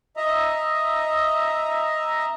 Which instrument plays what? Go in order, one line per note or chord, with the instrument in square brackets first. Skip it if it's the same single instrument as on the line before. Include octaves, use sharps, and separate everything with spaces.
[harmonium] D#5 E5 A#5